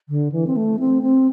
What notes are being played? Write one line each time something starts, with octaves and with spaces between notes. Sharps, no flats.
D3
E3
C4
A3
C4
C4